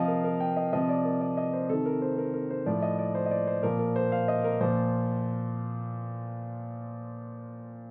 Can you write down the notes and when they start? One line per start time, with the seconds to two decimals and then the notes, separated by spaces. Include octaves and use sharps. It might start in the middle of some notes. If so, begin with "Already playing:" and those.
Already playing: C3 F3 D#5 F5
0.08 A#4
0.24 A#4
0.40 G5
0.57 D#5
0.73 C3 F3 D#5
0.89 D5
1.05 A#4
1.21 D5
1.37 D#5
1.53 C5
1.69 C3 D#3 A4
1.86 A#4
2.02 C5
2.18 A#4
2.34 A#4
2.50 C5
2.66 A2 F3 D5
2.82 D#5
2.99 D5
3.15 C5
3.26 D#5
3.31 D5
3.47 C5
3.63 A#2 F3 A#4
3.79 A#4
3.96 C5
4.12 F5
4.28 D#5
4.44 A#4
4.61 A#2 F3 C5